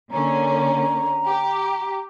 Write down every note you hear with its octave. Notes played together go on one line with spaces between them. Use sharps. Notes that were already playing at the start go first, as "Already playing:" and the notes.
D3 A#3 C#4 A#5
G4